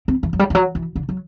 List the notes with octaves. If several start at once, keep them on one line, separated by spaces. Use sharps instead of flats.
C4
E3
F#3
G3
E3
F#3
E3
D3
F#3